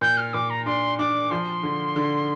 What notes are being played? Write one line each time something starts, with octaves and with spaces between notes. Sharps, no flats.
A#2 G6
F6
A#2 D6
A#5
D4 C6
D4 D6
F3 C6
D3
D3